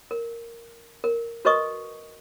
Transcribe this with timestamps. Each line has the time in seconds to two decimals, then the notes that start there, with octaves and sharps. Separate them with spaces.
0.11 A#4
1.04 A#4
1.45 F#4 A#4 B4 D#5 C#6 D#6